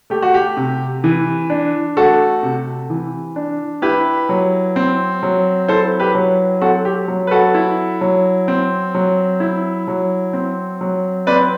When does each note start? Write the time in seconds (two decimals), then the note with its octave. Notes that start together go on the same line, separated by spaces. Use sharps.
0.10 A3 G4
0.22 F#4
0.34 G4
0.57 C3
1.04 E3
1.50 D4
1.97 A3 F#4 A4
2.43 C3
2.90 E3
3.36 D4
3.82 E4 G4 B4
4.29 F#3
4.76 C4
5.23 F#3
5.68 E4 A4 C5
6.00 G4 B4
6.15 F#3
6.61 C4 F#4 A4
6.85 G4
7.08 F#3
7.27 B4
7.31 F#4 A4
7.54 E4
8.01 F#3
8.48 C4
8.95 F#3
9.40 E4
9.88 F#3
10.33 C4
10.81 F#3
11.27 C4 B4 D5